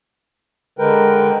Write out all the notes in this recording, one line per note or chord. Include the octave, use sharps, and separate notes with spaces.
D3 G#3 A#4 B4 G5